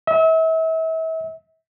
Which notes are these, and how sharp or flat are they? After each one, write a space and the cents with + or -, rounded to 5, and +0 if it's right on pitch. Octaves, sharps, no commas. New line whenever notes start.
E5 -35